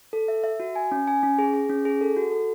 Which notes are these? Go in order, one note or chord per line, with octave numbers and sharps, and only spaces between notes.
A4
E5
E5
F#4
G#5
C#4
G#5
C#4
G#4
G#4
C#4
G#4
A4
F#4
A4